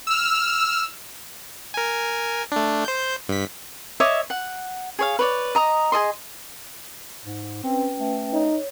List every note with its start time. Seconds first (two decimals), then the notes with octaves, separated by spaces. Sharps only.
0.07 E6 F6
1.74 A#4 G#5
2.52 A3 D4
2.85 C5 G6
3.29 G2 B6
4.00 C#5 D#5 E5 D6
4.30 F#5
4.99 G#4 C#5 F5
5.19 B4 C#5 D5
5.55 D#5 A#5 D#6
5.92 G#4 A4 D#5 C6
7.25 G#2
7.64 C4 C#4 B4 G5
7.99 A3
8.33 D#4 C#5